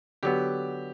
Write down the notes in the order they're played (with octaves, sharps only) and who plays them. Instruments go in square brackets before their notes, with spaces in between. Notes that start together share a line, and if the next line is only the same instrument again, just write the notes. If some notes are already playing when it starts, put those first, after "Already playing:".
[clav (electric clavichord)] D3 F#3 B3 [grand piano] G4